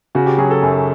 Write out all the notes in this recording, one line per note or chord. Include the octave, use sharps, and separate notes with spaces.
C#3 F#4
G4
F#3 G#4
A4
F#2